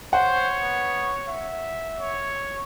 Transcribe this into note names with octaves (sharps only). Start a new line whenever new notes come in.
C5 C#5 F#5
B3
E5
C#5